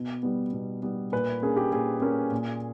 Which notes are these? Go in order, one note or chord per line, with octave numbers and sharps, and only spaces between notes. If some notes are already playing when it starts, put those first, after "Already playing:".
Already playing: B2 B4
G3 B3
B2
G3 B3
A#2 B4
A#3 C#4 G#4
G4
A#2 G#4
A#3 C#4
A#2